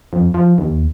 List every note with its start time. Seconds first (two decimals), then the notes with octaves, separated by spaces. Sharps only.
0.13 F2
0.34 F3
0.58 D#2